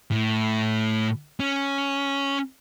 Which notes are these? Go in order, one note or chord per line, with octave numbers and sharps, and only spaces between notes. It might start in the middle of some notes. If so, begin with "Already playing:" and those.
A2
C#4